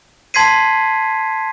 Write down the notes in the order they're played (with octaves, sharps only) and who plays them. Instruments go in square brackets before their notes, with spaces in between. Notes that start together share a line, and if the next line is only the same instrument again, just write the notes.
[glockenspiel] A5 C6 G#6 B6 C7 D#7